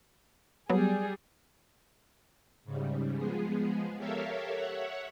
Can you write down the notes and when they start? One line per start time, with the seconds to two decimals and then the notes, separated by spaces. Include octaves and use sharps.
0.70 F#3 G3 B3 G#4
2.64 G#2 C#3 G3
3.17 F3 G#3 B3 G#4
3.98 G4 A4 A#4 C#5 E5 F5
4.52 C#5 E5 F#5